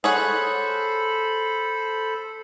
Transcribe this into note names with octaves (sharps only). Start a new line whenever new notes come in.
G#4 A4 C5 C#5 F#5 B5